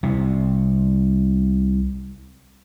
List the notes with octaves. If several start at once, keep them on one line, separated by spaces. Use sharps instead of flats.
C2 C3